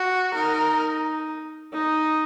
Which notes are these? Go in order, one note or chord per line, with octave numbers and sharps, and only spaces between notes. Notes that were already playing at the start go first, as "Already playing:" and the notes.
Already playing: F#4
D#4 A#4
D#4